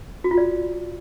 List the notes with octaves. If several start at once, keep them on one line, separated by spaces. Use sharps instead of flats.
F#4
F4
D5